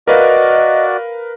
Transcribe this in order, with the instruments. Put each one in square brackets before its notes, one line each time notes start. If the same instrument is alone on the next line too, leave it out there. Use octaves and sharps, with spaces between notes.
[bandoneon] F#4 D5 [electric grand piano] A#4 B4 F5 [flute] D#5